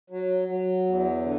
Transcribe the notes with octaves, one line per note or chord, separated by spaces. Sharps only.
F#3
F#3
E2
D3